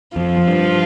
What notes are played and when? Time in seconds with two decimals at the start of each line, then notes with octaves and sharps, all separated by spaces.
0.16 F2 F3 F4
0.37 F2
0.47 G2